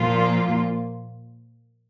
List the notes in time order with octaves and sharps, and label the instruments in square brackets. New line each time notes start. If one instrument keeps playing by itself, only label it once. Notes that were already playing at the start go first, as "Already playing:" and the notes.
Already playing: [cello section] A#2 F3 A#3 F4